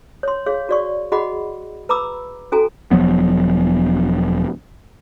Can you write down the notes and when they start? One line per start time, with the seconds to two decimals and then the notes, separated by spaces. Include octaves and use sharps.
0.23 C#5 C6
0.46 G#4 C#5 F5
0.69 F#4 D5 C#6
1.12 F#4 G#4 D#5 F#5 B5
1.89 B4 A#5 B5 D6 E6
2.52 C#4 F#4 A4 G#5 A#5
2.91 E1 F3 F#3 B3